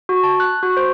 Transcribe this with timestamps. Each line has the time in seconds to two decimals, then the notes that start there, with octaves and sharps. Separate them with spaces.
0.09 F#4
0.24 A5
0.40 F#6
0.63 F#4
0.77 C5